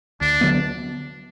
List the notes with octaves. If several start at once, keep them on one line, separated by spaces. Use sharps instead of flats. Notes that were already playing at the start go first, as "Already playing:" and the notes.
D2 D4
D3 F#3 B3